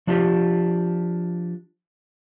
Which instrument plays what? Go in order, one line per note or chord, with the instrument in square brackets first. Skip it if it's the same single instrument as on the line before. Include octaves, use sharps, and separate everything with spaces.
[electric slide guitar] F3 D4 F4 G4